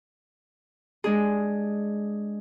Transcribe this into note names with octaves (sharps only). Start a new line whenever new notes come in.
G#3 D4 G#4